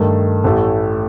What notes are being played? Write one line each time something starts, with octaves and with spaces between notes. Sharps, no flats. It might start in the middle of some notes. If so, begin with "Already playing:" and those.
Already playing: G2 D#3 A3
A1 A2 A3